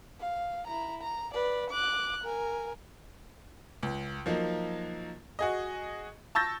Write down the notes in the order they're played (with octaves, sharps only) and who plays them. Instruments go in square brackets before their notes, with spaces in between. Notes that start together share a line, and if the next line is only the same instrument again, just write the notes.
[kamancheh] F5
E4 A#5
A#5
B4 D5
D6 F#6
A#4 G#5
[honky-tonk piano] C#2
F3 F#3 A#3 D#4
F#4 G#4 D#5
A5 C#6 E6 G6 A6 A#6